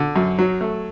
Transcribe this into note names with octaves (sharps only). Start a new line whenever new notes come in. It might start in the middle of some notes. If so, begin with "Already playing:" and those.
Already playing: D3
F#2
F#3
A3